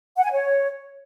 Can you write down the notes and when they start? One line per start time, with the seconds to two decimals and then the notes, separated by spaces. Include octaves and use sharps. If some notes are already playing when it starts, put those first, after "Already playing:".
0.17 F#5
0.24 G#5
0.32 C#5